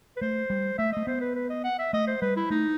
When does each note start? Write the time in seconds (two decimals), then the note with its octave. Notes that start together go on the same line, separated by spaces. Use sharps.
0.17 B4
0.21 A3 C5
0.50 G3
0.78 A3 E5
0.93 A3 D#5
1.07 B3 C5
1.21 B4
1.36 B4
1.50 D#5
1.64 F#5
1.79 E5
1.93 A3 D#5
2.08 C5
2.21 G3 B4
2.37 E4
2.50 A3 D#4